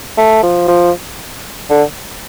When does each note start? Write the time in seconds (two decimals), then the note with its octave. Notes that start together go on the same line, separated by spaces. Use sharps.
0.17 A3
0.43 F3
0.68 F3
1.70 D3